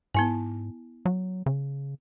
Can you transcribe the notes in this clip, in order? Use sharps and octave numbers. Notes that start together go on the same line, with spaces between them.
G#2 B3 E4 G#5
F#3
C#3